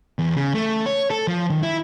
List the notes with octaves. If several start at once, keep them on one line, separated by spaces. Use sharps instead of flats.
E2
C#3
A3
C#5
A4
F3
D#3
E4